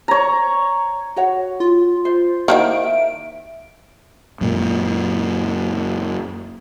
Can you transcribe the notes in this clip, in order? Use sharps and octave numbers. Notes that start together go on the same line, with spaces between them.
C#5 A#5
F#4 C#5 F#5
F4
C5
D#3 A3 A#3 E4 C5 F#5 D7
E5
F#2 A#2